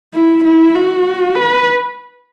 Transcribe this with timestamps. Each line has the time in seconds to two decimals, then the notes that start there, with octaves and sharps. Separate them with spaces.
0.14 E4
0.44 E4
0.74 F#4
1.35 B4